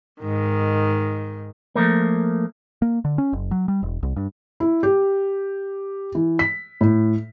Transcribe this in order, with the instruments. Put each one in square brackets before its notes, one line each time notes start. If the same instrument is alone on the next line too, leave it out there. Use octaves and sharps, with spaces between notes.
[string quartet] G#2 D#3
[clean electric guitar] F3 A3 A#3
[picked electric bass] A#3
D3
C#4
F#1
F#3
G3
E1
C2
G2
[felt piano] E4
G4
E3
B6
A2